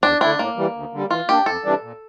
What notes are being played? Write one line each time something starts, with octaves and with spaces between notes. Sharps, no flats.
E2 D4
D3 A3 D4 E4
A2 A#3
E3 G3
D2
D3 G3
E3 F4
A#3 D4 G4
F2 A4
C3 E3 G3 D4
A#2